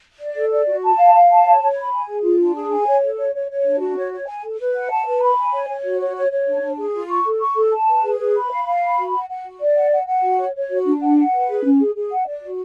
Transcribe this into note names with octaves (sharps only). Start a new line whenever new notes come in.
D5
A4
D5
F#4
A5
F5
F5
A5
C#5
C#5
B5
G#5
G#4
F4
D4
G#4
G#5
C#5
A4
C#5
C#5
C#5
D4
F#4
C#5
C#5
G#5
A4
B4
F#5
A5
B4
B5
G#5
C#5
C#5
F#4
C#5
C#5
C#5
D4
D4
G#4
F4
C#6
A4
C#6
A4
A5
B4
G#4
B4
B5
F5
F5
B5
F#4
F#5
F#5
F#4
D5
F#5
F#5
F#5
F#4
C#5
C#5
F#4
D4
F#5
F#5
B4
G#4
C#4
G#4
G#4
F#5
D5
F#4